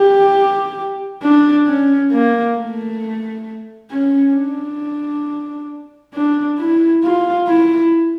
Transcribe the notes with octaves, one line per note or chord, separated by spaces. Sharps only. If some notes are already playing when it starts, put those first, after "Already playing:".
Already playing: G4
D4
C#4
A#3
A3
C#4
D4
D4
E4
F4
E4